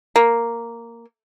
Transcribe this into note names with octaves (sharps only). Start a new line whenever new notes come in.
A#3